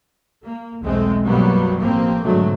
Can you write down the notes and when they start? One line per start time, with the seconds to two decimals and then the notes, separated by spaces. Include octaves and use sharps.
0.44 A#3
0.82 B1 E2 B2 G#3 A3 C4
1.23 F#2 B2 F#3 G3 A#3 B3
1.79 A1 F3 A#3 C4
2.23 G#2 B2 D3 F#3 A3